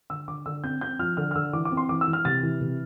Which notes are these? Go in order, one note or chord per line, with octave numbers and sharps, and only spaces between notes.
D3 E6
D3 D6
D3 E6
C4 G6
C4 G6
F3 F6
D3 F6
F6
D3 E6
E3 D6
D6
C4
C6
E3 D6
E6
E3
F6
C3 A6
E3
C3